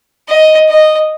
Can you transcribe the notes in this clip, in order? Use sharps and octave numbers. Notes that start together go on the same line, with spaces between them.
D#5
D#5